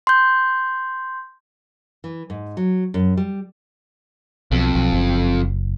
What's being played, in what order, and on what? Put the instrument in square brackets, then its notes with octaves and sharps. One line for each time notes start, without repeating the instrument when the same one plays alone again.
[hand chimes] C6 G6
[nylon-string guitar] E3
G#2
F#3
F#2
G3
[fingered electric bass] B1 [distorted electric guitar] F2
[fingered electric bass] B1
F#1